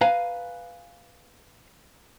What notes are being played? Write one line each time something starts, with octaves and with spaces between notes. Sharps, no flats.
B4 F5 G#5 A#5